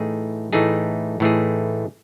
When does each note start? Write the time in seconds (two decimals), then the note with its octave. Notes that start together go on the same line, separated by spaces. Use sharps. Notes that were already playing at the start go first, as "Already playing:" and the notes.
Already playing: A2 E3 A3 D#4 G#4
0.53 A2 E3 A3 D#4 G#4
1.20 A2 E3 A3 D#4 G#4